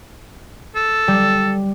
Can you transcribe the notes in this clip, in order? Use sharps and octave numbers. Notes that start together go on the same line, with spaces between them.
A4
G3